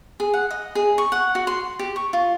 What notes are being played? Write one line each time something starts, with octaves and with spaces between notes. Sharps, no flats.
G#4
F#5
D#5
G#4
C#6
F#5
F#4
C6
G4
C#6
F4